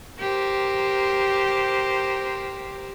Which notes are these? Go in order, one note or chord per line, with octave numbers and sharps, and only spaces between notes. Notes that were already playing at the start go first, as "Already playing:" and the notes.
G4 A#4 C5